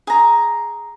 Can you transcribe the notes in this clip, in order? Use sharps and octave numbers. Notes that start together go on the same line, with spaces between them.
G#4 A#5